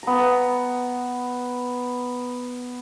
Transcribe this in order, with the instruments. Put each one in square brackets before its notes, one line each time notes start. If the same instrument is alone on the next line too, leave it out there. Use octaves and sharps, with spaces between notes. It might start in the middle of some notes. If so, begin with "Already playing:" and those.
[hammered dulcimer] B3 A#5